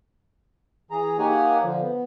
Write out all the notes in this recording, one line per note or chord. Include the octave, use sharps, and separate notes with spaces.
E3 G#4 A#5
A#3 D#4 G4 C#5 F#5 G#5
D3 F3
B3